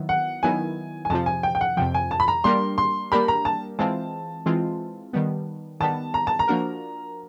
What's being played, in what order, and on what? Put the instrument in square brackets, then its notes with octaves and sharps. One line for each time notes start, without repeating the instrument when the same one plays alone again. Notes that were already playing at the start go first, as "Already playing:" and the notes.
Already playing: [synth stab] D#3 F#3 B3 E4
[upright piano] F#5
[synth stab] D#3 F#3 B3 E4 [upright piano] G#5
[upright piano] G#5
[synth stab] F2 C3 F3 [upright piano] A5
[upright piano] G#5
G5
G5
F#5
[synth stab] F2 C3 F3 [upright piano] G5
[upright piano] G#5
A5
B5
A#5
[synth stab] G3 A#3 D4 G4 A#4 [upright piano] C6
[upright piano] C6
[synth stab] G3 A#3 D4 G4 A#4 [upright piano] B5
[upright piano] A#5
A5
[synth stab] E3 G#3 C4 F4 [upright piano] A5
[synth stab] E3 G#3 C4 F4
D#3 G3 B3
[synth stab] D#3 G3 B3 [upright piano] A5
[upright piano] A#5
A5
A#5
[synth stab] F3 A#3 D4 F#4 A#4